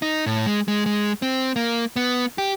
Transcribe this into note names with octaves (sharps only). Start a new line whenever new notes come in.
D#4
A2
G#3
G#3
G#3
C4
A#3
B3
G4